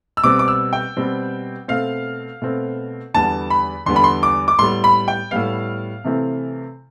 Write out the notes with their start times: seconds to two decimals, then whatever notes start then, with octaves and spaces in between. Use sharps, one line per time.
0.17 E6
0.23 B2 G3 C4 D6
0.39 D6
0.48 E6
0.73 G5
0.97 B2 G3 C4
1.68 B2 A3 C4 F5
2.42 B2 A3 C4
3.14 E2 D3 G3 B3 A5
3.50 B5
3.86 E2 D3 G3 B3 C6
3.96 B5
4.04 C6
4.23 D6
4.48 D6
4.58 A2 G3 B3 C6
4.84 B5
5.08 G5
5.31 A2 G3 B3 F5
6.04 C3 E3 A3 C4